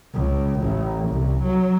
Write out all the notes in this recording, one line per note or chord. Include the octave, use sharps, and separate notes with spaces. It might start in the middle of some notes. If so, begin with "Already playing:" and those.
C#2
A1
C2
F#3